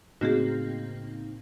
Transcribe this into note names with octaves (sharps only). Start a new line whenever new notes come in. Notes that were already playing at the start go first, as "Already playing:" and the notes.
A2 C#3 A#3 C4 D#4 F#4 G#4